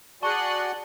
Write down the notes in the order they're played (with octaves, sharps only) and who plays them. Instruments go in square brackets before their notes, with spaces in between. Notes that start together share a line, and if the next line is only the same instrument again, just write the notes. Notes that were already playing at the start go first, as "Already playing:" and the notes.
[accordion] F#4 D5 F#5 [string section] G#4 F#6 [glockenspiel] A5 G7 [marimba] C#6